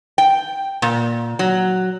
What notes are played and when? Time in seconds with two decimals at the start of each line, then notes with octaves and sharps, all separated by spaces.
0.18 G5
0.82 A#2
1.39 F#3